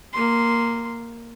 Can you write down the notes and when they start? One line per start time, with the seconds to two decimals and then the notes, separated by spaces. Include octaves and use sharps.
0.14 A#3 C6